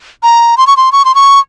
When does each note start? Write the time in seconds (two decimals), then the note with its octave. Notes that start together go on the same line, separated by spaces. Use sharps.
0.23 A#5
0.58 C6
0.67 C#6
0.77 C6
0.92 C#6
1.05 C6
1.15 C#6